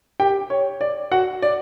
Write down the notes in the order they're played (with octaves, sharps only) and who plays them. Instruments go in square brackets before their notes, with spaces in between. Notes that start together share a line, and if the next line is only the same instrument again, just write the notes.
[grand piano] G4 G5
C#5
D5
F#4 F#5
D5